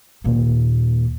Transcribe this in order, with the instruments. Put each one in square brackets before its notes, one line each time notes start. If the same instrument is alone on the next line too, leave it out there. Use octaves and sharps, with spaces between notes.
[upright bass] D#2 A#2